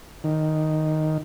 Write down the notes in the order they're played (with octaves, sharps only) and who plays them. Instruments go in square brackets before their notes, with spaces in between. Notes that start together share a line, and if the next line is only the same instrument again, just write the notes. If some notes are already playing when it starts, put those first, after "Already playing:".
[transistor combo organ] D#3